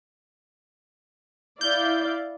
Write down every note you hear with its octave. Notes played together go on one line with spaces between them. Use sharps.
E4 D5 F5 G6